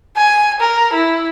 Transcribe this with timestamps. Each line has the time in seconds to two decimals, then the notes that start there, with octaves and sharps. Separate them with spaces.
0.16 G#5
0.60 A#4
0.93 E4